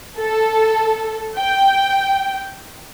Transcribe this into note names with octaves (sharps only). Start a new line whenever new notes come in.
A4
G5